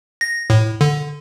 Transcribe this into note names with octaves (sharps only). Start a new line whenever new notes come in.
A#6
A2
D3